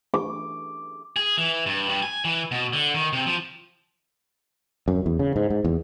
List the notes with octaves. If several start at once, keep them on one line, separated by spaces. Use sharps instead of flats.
D6
G#4
E3
G2
G2
G#5
E3
B2
D3
D#3
C3
F3
F#2
E2
C#3
G#2
G#2
E2